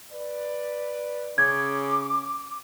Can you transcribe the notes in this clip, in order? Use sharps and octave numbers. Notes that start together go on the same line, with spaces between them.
B4 D5
C#3 C#4 D6 G#6